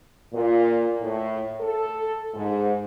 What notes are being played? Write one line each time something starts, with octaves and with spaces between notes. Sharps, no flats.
A#2
A2
A4
G#2